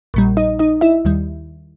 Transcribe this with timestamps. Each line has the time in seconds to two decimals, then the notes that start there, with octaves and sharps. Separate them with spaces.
0.14 A#1 A#2 G3
0.37 D#4 D#5
0.59 D#4 D#5
0.81 E4 E5
1.05 D#2 D#3 G3